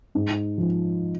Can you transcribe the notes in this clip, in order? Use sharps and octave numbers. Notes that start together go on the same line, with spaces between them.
G#2
F3